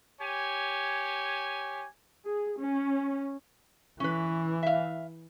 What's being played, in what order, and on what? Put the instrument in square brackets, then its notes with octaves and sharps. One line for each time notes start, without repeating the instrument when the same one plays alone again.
[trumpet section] G4 C#5 G#5
[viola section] G#4
C#4
[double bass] E3 [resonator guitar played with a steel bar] C#4 B4
[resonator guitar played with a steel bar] E5 F5